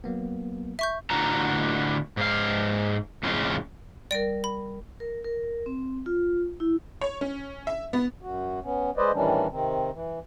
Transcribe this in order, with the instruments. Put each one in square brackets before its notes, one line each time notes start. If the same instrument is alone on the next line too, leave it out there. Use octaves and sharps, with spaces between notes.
[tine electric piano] F#3 A#3 B3
[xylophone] E5 C#6 G6
[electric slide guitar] A2 D3 F4 F#4 A4 A#5
G#2 F5
F2 A2 C#3 F4
[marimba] G3 A#4 [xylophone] D5 D7
[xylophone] B5
[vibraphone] A#4
A#4
C4
F4
E4
[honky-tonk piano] C#5
C#4
E5
B3
[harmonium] F#2 F#4
B3 C#4
G#3 B4 C5 D5 D#5
A2 D#3 E3 G3 C#4 D4
C3 D#3 C4
E3